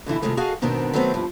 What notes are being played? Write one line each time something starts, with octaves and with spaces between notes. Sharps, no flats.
B2 D3 E3 E4
C3 D#3 F3 G#3 A3
F#4 G#4 A4 D#5 F5 F#5
G#2 B2 D#3 B3 C4 D4
D#3 F#3 A3 B3 C4
G2 F3